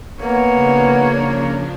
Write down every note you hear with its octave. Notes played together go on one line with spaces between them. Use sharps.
A#3 B3 C#5
C#3 F3 D4